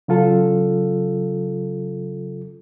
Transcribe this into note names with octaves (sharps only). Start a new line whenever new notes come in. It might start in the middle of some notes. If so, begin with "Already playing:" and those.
C#3 F#3 F4 A4